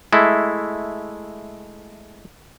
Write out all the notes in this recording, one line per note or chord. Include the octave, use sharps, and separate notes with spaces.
G#3 A3 E4